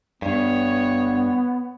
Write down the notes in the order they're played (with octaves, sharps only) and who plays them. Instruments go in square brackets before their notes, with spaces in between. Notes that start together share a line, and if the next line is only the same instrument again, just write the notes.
[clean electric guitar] G2 [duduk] B3 [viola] C#5